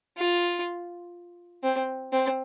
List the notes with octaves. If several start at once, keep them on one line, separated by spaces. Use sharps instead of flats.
F4
C4
C4